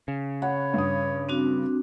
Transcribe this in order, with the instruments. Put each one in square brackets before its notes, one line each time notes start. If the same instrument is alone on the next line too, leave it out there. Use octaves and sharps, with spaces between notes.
[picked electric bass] C#3
[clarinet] C#5 [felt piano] F#5 [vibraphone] B5
[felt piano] G2 D#6
[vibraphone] C4 D4 F#4